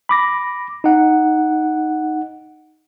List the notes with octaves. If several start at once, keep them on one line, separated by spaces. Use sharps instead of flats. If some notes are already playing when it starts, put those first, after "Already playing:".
B5 D6 A#6
D#4 F#5